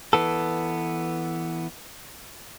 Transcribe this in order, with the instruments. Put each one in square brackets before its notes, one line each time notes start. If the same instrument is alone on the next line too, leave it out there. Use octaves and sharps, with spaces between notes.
[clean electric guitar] E3 B3 A4